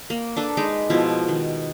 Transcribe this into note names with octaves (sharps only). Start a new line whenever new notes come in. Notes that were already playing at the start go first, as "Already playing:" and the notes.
A#3
D4 A4 B4
G#3 D#4 B4 D6
B2 F3 E4
D#3